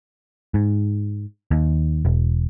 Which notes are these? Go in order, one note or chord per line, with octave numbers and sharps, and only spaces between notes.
G#2
D#2
E1